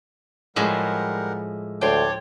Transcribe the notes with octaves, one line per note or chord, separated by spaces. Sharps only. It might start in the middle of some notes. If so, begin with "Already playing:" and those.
A2 F3 G3 G#3 A#4 F#5
D2 C#5 G5 A5 C6 D6